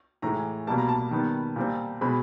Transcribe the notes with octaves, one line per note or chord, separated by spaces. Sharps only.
A2 E3 G#3 A#5
B2 G3 A#3 A5
A#5
A5
D#3 G3 B3
A#2 G3 C4
B2 G#3 C4 B5